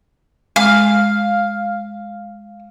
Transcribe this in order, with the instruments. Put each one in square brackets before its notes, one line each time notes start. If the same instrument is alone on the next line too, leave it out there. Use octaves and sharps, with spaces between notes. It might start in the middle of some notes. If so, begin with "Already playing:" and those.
[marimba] G#3 [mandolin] F5